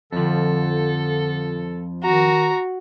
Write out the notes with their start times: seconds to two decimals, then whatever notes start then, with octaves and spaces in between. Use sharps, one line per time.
0.12 F2 D3 F3 A4
2.04 D#3 F#4 A#5